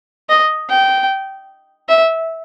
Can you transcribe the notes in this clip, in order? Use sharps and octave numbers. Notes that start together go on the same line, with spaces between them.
D#5
G5
E5